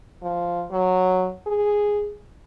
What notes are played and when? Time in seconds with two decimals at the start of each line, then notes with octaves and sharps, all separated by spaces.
0.23 F3
0.71 F#3
1.47 G#4